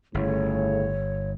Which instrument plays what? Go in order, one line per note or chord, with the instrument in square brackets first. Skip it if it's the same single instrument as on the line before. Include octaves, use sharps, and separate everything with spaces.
[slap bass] G1 [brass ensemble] A2 C#3 [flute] C#5